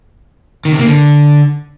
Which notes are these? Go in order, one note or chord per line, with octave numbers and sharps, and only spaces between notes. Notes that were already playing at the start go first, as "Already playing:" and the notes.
D#3
C3
A#3
D3